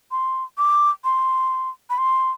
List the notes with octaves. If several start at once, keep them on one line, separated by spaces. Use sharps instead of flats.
C6
D6
C6
B5
C6